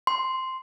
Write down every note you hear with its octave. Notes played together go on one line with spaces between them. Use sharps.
C6